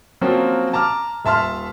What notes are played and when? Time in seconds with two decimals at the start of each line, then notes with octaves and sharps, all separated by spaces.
0.21 F3 F#3 A#3 C4 C#4 F#4
0.73 A5 A#5 D6 F6
1.25 D#1 E5 A5 C6 F6